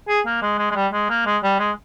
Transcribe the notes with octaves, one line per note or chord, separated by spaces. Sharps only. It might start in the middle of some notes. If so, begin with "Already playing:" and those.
G#4
A#3
G#3
G#3
G#3
G3
G#3
A#3
G#3
G3
G#3